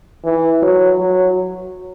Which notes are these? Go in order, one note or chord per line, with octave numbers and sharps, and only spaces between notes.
E3
F#3
F#3